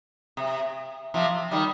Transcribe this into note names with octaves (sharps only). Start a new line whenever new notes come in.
C3
C3 F3
D#3 G3